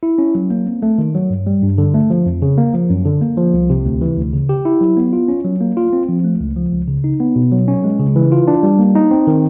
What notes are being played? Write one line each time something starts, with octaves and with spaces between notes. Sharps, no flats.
E4
C#4
F#3
A#3
C4
A3
D#3
F#3
G2
G3
G2
D3
A3
F3
F2
C#3
A#3
F3
F#2
D3
A#3
F3
C2
C3
D2
E3
D2
C#3
G4
E4
F#3
B3
F4
C#4
F#3
A#3
F4
C4
F3
A3
C#2
F3
C#2
C#3
D#4
B3
B2
F#3
C#4
G#3
C#3
E3
F4
D4
G3
A#3
D#4
C4
D#3